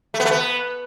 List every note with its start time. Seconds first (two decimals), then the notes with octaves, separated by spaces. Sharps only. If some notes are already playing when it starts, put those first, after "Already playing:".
0.14 A3
0.20 B3
0.25 A3
0.31 B3